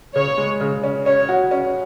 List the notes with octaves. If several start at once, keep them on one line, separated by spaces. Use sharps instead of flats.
C#3 C#5
G#3
C#3
C#4
C#4 C#5
F#4
C#4